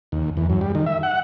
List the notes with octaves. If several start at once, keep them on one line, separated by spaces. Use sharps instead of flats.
D#2
E2
F#2
G3
D#3
E5
F#5